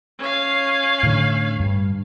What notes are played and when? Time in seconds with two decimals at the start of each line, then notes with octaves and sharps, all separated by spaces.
0.18 C#4 F5
1.03 A2 D3
1.60 G2